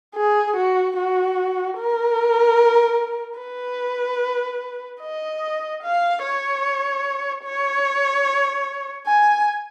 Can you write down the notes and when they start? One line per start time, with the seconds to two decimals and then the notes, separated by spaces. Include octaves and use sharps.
0.16 G#4
0.56 F#4
0.97 F#4
1.78 A#4
3.39 B4
5.02 D#5
5.83 F5
6.23 C#5
7.44 C#5
9.07 G#5